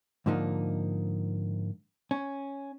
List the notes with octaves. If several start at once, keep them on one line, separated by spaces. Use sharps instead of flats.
G#2 D3 F3 A#3 D4 D#4
C#4